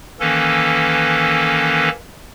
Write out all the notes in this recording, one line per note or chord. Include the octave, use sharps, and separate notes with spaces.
D#3 E3 A#3 C#4 A4 B4